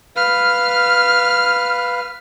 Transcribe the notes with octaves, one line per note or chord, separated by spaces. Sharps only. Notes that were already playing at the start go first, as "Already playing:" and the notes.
B4 F5 F6